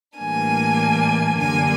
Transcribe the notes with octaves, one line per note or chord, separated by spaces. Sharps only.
A2 E3 G3 A#3 D4 G#5
F#2 D3 G3 A#3 D4 G#5